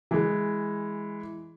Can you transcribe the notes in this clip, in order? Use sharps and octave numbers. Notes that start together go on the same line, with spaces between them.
E3 G#3